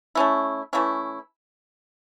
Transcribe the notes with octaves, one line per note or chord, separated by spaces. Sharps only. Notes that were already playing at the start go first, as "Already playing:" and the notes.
A3 C#4 E4
E3 A3 C#4 E4